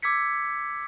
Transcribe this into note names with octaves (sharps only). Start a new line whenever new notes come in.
D6 E6 G#6 B6 C#7